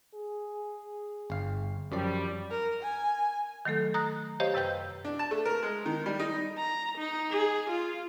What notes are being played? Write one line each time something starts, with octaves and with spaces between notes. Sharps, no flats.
G#4
G1 F5
F#2 F3 G3 D5
A#4
G#5
D#3 F#3 A3 A4
A#5 D#6 F#6 A#6
G4 C5 C#5 D#5 F5
F#2 C3 B4 G5 G6
D4
A5
A3
A#4
G#3
D#3
G3
D#4
A#5
D#4
G#4
F4